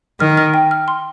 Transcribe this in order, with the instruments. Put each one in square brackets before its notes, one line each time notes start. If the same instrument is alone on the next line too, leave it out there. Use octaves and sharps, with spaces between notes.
[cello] D#3 [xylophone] F6
[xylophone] F6
G5
F6
C6